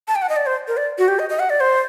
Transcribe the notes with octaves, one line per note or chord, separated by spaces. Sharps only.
A5
G5
F#5
D#5
D5
C5
A#4
D5
F#4
G4
D#5
D#5
F#5
D5
C5